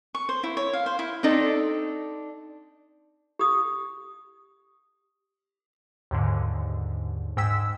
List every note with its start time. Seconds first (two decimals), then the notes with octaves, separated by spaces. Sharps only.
0.15 C#6
0.29 C5
0.43 E4
0.57 C#5
0.73 F5
0.86 C5
0.99 E4
1.23 C4 D4 D#4 A4 D5
3.39 G4 D#6
6.11 D#2 G#2 D3
7.37 G#2 G#3 G5 E6 B6